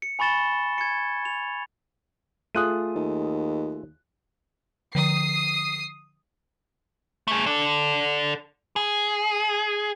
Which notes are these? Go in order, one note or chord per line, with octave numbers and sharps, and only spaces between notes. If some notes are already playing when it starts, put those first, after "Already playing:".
C#7
G#5 B5 C#6 A6 E7 G7
G#6 C#7
F7
A3 F4 G#4 D#6 F#6 D#7
D#2
D3 F3 D#6 C7
A3 G#4
A4 D5
G#4